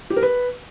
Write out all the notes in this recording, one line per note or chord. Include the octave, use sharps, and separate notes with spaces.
G4
A#4
B4